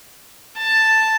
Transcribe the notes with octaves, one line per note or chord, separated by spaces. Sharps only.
A5